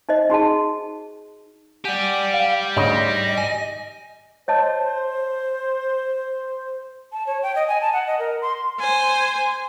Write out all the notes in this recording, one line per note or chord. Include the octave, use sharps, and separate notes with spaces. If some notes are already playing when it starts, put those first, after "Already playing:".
D#4 C5 D#5
D#4 F#4 G#4 A5
G4 D5 F#5 G#5
F5
D2 G#2 C#3 D#5 E5
G#5
C5 C#5 D#5 A5
A5
C#5
G5
D#5
G#5
A5
F#5
D#5
A#4
C6
C5 G#5